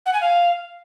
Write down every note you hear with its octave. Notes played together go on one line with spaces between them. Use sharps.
F#5
G#5
F5